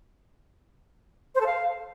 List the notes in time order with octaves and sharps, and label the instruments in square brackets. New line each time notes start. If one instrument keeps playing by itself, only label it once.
[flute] C5
A4
F5